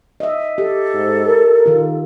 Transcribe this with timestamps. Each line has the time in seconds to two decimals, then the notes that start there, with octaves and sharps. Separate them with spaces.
0.20 D#5 E5
0.58 G4 A4
0.94 G#2
1.27 A#4
1.66 D#3 F4